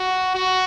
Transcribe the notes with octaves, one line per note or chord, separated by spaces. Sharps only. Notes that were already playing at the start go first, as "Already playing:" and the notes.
Already playing: F#4
F#4